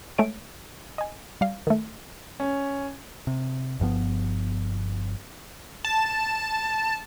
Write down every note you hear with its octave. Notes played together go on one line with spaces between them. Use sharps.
G#3 A3 A4 C#5 D7
D#5 G#5
G3 F5
D#3 A3
C#4
C3
G1 G2 F3 B3
A5